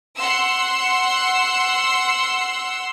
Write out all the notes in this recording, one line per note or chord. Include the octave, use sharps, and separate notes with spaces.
F#5 C6 E6